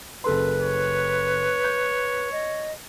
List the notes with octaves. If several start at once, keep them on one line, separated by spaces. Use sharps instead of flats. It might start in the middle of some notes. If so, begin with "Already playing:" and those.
F#1 A4 B4 C6
C#5
G6
D#5